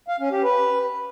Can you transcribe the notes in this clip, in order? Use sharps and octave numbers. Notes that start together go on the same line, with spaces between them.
F5
C#4
G4
B4